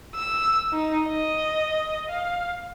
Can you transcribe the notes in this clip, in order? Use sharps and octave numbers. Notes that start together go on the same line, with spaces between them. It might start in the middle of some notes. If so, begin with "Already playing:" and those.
E6
D#4
D#5
F5